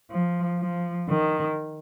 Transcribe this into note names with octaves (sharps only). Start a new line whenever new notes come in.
F3
F3
D#3